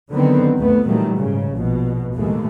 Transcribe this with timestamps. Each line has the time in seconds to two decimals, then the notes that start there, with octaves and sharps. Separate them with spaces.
0.12 D3 D#3 F#3 B3 C4
0.57 D2 G2 A3 B3
0.86 A#2 D#3 E3 F#3 G3 A3
1.16 G#2 C#3
1.54 A#1 B2
2.14 D#2 A2 E3 G#3 A3